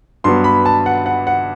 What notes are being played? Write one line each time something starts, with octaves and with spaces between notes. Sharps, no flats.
G2 F#3 B3 C6
B5
A5
F#5
F#5
F#5